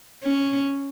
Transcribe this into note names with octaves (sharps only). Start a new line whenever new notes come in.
C#4